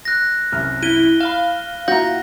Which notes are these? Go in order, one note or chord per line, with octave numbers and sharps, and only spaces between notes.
F#6 A#6
C2 F#2 F6
E4 D#7 G7
F5 B5 F6 E7
A#2 E4 F#4 A#5 G6 A#6